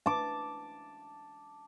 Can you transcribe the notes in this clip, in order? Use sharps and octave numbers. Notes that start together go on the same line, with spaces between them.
A5 D6